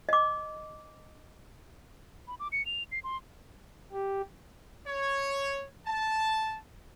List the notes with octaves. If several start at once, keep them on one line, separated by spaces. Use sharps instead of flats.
D#5 D6
B5
D6
C#7
F7
C7
C6
G4
C#5
A5